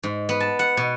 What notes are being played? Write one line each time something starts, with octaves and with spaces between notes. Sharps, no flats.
G#2
B3
A5
F#5
B2